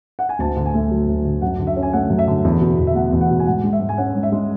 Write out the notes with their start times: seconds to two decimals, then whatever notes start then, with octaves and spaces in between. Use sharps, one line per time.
0.19 F#5
0.29 G#5
0.39 D2 A5
0.56 D3
0.66 G#5
0.74 A3
0.91 F#3
1.08 D2
1.25 D3
1.42 F#2 F#5
1.59 D3
1.67 E5
1.76 C#4
1.83 G#5
1.93 A3 F#5
2.10 F#2
2.19 E5
2.27 D3
2.45 E2
2.61 B2
2.79 E2
2.87 E5
2.95 A3 F#5
3.12 E2
3.21 F#5
3.30 B2
3.39 G#5
3.46 G#2 F#5
3.64 G#3
3.73 E5
3.80 G#2
3.89 G#5
3.98 C#4 F#5
4.15 G#2
4.23 E5
4.32 G#3